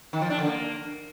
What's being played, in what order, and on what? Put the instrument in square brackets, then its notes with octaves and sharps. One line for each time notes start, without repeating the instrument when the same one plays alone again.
[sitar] D#3
F3
D4
D3
A#3